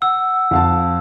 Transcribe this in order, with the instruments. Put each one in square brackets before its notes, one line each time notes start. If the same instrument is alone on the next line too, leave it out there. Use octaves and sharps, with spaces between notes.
[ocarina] F#5 [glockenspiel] E6
[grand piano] F2 F5 A5